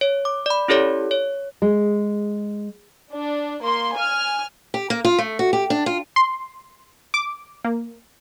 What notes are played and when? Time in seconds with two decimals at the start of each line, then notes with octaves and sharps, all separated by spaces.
0.01 C#5
0.25 D6
0.46 D5 B5
0.68 C#4 E4 G4 A4 C#5 D5
1.11 C#5
1.62 G#3
3.13 D4
3.63 A#3 C6
3.93 G#5 F6
4.74 G4
4.90 A#3
5.05 F4
5.18 A3
5.39 F#4
5.53 G4
5.70 D4
5.86 F4
6.16 C6
7.14 D6
7.64 A#3